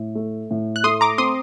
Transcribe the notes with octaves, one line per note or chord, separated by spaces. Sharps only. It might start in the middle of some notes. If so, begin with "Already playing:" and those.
Already playing: A2
A3
A2
F#6
A3 C6 D#6
A#5 D6
C4 C6 D#6